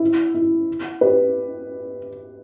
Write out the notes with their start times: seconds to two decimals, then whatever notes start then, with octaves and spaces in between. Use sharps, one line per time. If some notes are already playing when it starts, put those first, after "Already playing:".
Already playing: E4
0.34 E4
1.01 G4 B4